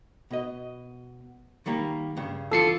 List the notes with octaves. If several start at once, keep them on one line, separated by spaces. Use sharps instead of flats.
B2 D#5
D#3 G3 A#3
G2 C#3
E3 F4 A4 C7 C#7